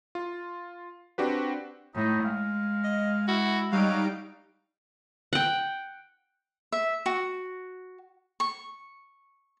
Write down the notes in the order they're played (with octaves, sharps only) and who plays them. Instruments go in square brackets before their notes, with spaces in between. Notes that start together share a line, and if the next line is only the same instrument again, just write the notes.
[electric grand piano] F4
C4 D4 F#4 G4 B4
[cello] A2 [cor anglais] D#4
[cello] G#3 [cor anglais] F5
[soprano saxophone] D#5
[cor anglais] E4 [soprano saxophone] F#4
[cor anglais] F#3 [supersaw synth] G3 D#4 D7 [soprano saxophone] F5
[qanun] F#5 G5
[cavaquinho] E5
F#4
C#6